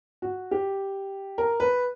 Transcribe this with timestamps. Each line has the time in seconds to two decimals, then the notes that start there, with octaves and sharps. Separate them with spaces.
0.22 F#4
0.51 G4
1.38 A#4
1.60 B4